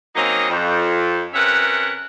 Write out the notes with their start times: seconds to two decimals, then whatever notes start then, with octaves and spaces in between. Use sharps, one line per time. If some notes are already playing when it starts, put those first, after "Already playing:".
0.16 F#3 A#3 C4 C#4 D#4 D#5
0.49 F2
1.34 C3 C#4 A#4 B4 E5 F#5